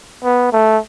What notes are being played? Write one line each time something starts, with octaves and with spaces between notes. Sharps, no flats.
B3
A3